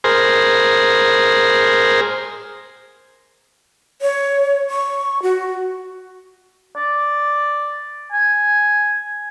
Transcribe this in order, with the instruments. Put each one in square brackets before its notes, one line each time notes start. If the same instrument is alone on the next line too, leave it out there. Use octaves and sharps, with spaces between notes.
[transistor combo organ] G#4 A#4 C5
[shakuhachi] C#5
C#6
F#4
[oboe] D5
G#5